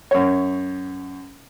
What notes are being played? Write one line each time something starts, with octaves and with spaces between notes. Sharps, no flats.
F#2 C#5